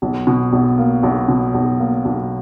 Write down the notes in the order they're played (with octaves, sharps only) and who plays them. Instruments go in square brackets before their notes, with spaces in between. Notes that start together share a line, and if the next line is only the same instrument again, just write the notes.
[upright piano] B1
B2
B1
A#3
B1
B2
B1
A#3
B1